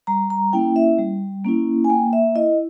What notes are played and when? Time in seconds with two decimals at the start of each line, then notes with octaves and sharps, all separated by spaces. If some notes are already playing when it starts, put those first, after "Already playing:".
0.07 G3 A#5
0.30 A#5
0.53 A#3 C#4 E4 G5
0.76 E5
0.98 G3
1.44 A#3 C#4 E4
1.84 G#5
1.90 A#3 G5
2.13 E5
2.35 E4 D#5